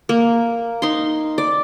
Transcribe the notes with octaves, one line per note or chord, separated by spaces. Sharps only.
A#3
D#4 C6
D5